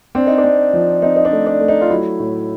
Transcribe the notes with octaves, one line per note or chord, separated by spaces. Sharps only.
C4 D4
D#4
D4
C4
F3
C4 D#4
D#4
D4
A3
D4
A3
D#4
F4
F#3 E4
A2